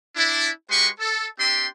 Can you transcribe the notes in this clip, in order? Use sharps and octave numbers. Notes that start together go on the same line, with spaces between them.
D4 E4
G#3 F#4 G4 B4 C6 C#6
A4
C4 D4 G4 E5 G5 C6